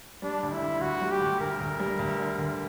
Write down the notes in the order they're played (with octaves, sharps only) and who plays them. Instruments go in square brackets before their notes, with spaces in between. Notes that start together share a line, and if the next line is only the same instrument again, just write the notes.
[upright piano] G3 [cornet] D4
[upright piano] D2
[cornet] E4
[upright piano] D2
[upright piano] D2 [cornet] F#4
[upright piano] G3
[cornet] G4
[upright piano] D2
[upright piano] D2 [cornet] A#4
[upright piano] D2
G3
D2
D3
D2